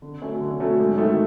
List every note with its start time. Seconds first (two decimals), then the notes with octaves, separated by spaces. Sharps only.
0.02 D3
0.22 F#3 A3 C#4
0.41 D3
0.60 F#3 A3 C#4
0.79 G#2
0.98 D#3 F#3 A3